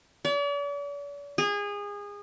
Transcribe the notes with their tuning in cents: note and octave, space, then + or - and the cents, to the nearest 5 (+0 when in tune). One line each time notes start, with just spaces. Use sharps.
D5 -45
G#4 -25